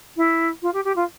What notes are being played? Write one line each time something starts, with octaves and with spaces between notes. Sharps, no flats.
E4
F4
G4
G4
F4